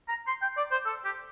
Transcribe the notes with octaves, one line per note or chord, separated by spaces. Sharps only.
A#5
C6
G5
D5
C5
A4
G4